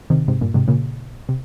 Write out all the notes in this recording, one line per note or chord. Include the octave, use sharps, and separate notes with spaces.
C3 D#3
G#2 C3
G2 A#2
G#2 C3
A#2 C#3
C3